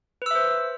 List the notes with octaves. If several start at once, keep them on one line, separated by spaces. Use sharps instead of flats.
B4 C5 E5 E6